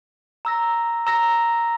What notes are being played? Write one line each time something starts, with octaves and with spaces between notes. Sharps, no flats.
A#5 E6 A#6
A#5 E6 A#6